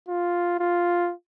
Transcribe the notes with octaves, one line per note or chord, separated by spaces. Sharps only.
F4
F4